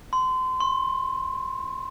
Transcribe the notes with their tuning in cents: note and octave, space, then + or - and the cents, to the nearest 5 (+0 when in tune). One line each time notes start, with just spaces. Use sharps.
C6 -30
C6 +40